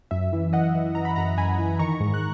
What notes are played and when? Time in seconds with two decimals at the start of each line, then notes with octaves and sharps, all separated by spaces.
0.11 F#2 E5
0.33 E3
0.53 E3 D#5 F#5
0.75 E3
0.95 E3 A#5
1.05 B5
1.16 F#2 F#5 A#5
1.37 F#2 G#5 B5
1.59 E3
1.79 D#3 A#5 C#6
2.00 G#2
2.14 F#6